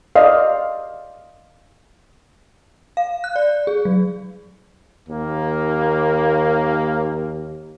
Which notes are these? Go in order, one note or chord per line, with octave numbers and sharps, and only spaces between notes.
D5 D#5 F5
F5
F#6
D5
G#4
F#3
D#2 A#3